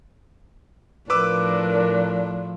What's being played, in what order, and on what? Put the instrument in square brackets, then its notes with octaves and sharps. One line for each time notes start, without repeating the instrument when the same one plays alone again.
[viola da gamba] A2 F3 [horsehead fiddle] D4 [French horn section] A#4 [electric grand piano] B4 D6 E6